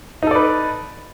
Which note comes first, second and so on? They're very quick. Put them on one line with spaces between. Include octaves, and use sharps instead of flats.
D#4 A4 D5 B4